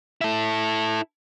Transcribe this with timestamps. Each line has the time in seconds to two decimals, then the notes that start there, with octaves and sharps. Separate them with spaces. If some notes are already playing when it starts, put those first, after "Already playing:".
0.21 E4 A4